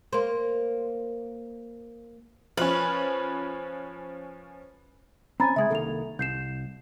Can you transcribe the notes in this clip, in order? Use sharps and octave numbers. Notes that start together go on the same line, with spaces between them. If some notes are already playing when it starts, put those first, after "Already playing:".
A#3 C5
F3 C#4 B4
C4 C#4 G#5 A#5 B5 A6
C#3 G#3 E5 D#6 G#6
C2 D#3 A#3 A4 F7
C2 G6 C7 E7